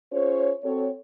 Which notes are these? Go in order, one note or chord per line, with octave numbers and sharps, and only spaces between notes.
C#4 F4 G#4 C5 C#5
C4 F#4 A4 C#5